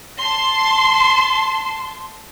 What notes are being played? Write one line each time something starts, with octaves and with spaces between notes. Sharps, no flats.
A5 C6